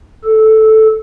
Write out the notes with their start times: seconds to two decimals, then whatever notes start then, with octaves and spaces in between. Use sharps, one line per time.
0.24 A4